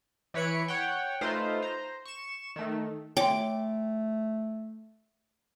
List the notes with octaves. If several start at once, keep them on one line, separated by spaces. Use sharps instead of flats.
E3 B4 C#5 B5 C#7 D7
C#5 F#5 G5
A3 D#4 F4 B4 C5
C5 A#5
C#6 E7
D#3 A3
A3 C#5 G5 C6 D6